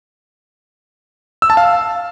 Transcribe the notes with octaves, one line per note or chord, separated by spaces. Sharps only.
E6
A5
F5